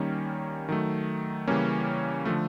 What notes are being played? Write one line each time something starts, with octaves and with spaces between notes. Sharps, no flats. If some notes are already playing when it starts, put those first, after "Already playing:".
Already playing: D#3 G3 A#3 C#4
D#3 F#3 A3
C#3 E3 G3 A#3 C#4
D3 F3 A3